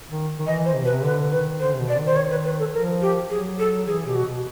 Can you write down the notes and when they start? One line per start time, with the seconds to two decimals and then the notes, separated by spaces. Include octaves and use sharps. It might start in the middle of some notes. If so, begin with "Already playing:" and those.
0.10 D#3
0.39 D#3
0.47 E3 D#5
0.65 C5
0.75 C3
0.84 B2 B4
0.93 C3
1.04 D3 B4
1.32 D#3 B4
1.60 D3 C5
1.74 C3
1.79 B2
1.89 D5
1.98 D#3
2.06 C5
2.16 C#5
2.31 B4
2.45 B4
2.59 A4
2.73 F3 A#4
3.02 G4
3.30 F#3 G#4
3.59 A4
3.86 E3 G#4
4.06 B2 G4
4.15 F#4
4.25 B2